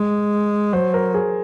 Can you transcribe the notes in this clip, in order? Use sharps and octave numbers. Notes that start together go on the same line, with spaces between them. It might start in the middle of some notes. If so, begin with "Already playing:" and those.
Already playing: G#3
F#3 C5
A#4
G#4